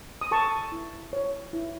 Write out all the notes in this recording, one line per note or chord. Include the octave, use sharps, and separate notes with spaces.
D#6
A4 A5 C#6
E4
C#5
E4